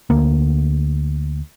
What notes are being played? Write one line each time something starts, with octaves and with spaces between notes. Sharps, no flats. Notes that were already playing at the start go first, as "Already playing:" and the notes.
D2 A#3